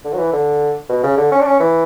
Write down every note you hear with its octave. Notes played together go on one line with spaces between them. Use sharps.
D3
F#3
E3
D3
B2
C#3
D3
C#4
D4
C#4
E3